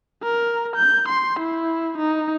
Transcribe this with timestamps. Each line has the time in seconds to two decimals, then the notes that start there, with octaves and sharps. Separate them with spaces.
0.23 A#4
0.76 G6
1.08 C6
1.39 E4
1.98 D#4